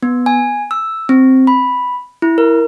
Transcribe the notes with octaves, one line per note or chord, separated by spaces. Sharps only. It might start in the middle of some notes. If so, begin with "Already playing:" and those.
B3
G#5
E6
C4
B5
E4
A#4